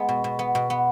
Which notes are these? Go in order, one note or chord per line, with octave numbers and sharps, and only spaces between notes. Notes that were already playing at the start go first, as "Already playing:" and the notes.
Already playing: G#3 B3
B2
B2
B3
B2
B3